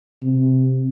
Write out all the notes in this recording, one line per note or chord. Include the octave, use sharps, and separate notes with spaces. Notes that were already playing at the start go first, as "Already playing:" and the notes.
C3